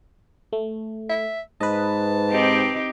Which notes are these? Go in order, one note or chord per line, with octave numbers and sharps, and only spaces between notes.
A3
E5
G#2 B4 D#5 A5
C4 D#4 G4